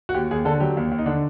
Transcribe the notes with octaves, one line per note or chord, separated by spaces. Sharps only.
F#4
D#2 G4
D#2 G#4
D3 A4
F#3 G4
D#2
D#2
D#4
D3 D4